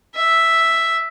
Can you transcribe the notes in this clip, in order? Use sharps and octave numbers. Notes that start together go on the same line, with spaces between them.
E5